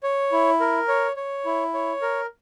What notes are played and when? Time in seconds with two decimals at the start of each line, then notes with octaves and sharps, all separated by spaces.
0.03 C#5
0.32 E4
0.60 A#4
0.88 C#5
1.16 C#5
1.45 E4
1.74 C#5
2.02 A#4